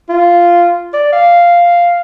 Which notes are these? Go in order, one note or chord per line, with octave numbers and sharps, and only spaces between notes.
F4
D5
F5